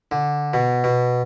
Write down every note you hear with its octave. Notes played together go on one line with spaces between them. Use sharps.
D3
B2
B2